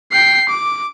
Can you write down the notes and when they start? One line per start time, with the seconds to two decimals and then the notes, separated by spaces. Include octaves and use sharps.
0.12 G5 C7
0.49 D6